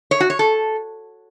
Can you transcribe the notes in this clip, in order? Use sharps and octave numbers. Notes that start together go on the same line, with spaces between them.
C#5
F#4
C#5
A4